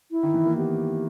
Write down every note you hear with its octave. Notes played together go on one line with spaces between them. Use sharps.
E4
D#3
E3
A#3
B3 G4